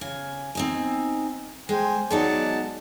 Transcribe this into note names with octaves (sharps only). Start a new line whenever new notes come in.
C#3 G#5
C4 D#4 G#5
G#3 C5 G5 G#5
F#3 G#3 B3 D#4 D5 A5